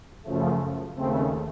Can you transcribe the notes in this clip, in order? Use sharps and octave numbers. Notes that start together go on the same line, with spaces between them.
F#2 C#3 F3 A3
D#2 C#3 A3 C4